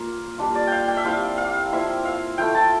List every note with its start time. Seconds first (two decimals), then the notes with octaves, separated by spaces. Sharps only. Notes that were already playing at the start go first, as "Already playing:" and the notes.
Already playing: A#3 F4
0.38 G3 D4 F4
0.55 D5
0.67 F5 G5
0.88 G5
0.97 E5
1.04 G3 C4 E4 F5
1.38 F5
1.72 F3 C4 E4 E5
2.05 F5
2.38 F3 A3 E4 G5
2.55 A5